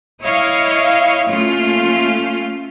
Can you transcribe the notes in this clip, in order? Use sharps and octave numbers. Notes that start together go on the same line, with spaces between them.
E4 C#5 D#5 F5
A3 A#3 C#4 F4